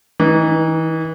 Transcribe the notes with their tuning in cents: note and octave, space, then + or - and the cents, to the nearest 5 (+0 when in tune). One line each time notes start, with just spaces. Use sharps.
E3 -35 D#4 +0